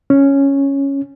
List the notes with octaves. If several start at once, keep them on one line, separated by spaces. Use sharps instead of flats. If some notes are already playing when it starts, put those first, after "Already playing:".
C#4